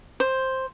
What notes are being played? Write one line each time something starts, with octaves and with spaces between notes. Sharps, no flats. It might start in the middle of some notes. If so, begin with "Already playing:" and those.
C5